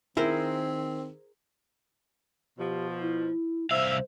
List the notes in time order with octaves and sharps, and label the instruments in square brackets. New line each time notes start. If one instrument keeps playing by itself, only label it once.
[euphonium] D#3 [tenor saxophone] C4 [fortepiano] E4 [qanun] G#4 A#4 C5
[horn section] B2 F3 [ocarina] G4
[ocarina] E4
[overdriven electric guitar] C2 F5 [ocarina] C5 [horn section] E5